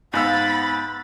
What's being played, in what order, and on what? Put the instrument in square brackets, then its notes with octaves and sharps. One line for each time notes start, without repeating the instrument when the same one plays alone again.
[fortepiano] G#2 E6 [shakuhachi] B3 [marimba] F5 G#5 [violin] B5 A6